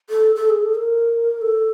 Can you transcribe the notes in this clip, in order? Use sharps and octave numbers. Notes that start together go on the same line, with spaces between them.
A4
A4
G#4
A4
A#4
A4